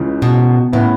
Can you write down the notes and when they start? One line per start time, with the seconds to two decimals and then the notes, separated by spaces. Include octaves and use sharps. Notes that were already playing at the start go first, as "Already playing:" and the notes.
Already playing: C#2 C#3 E3
0.22 B2
0.72 A2 C#3 E3 B3 E4